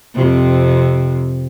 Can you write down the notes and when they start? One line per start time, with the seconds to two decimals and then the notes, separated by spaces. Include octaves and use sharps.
0.14 F2 C3